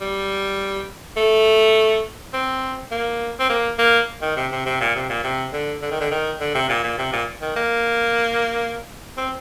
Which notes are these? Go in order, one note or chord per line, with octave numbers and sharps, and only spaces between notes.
G3
A3
C4
A#3
C4
A#3
A#3
D#3
C3
C3
C3
A#2
C3
A#2
C3
D3
D3
D#3
D3
D#3
D3
C3
A#2
A#2
C3
A#2
D#3
A#3
C4